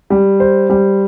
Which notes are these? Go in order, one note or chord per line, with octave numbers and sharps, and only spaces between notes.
G3
C5
G3